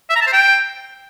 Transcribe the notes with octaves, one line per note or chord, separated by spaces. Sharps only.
E5
A#5
A5
C5
G5